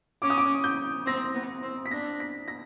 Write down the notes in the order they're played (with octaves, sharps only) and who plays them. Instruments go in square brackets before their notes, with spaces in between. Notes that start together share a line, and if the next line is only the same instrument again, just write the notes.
[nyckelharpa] C#4 [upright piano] D6
[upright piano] D#6
D6
G6
[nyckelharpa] C4 [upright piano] A#6
[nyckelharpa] B3
C4
[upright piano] B6
[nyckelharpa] D4 [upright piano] A#6
[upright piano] B6
A#6